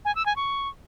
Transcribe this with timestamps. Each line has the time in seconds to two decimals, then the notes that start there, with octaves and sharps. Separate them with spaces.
0.05 G#5
0.15 E6
0.26 G#5
0.36 C#6